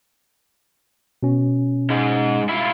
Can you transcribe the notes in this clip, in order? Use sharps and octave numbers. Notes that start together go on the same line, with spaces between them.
B2 C#4
G#2 G#3
E4 F4